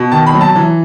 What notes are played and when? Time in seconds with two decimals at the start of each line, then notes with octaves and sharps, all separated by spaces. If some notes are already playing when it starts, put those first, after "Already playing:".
Already playing: B2
0.12 D#3 A5
0.27 B5
0.33 F#3
0.41 A5
0.55 E3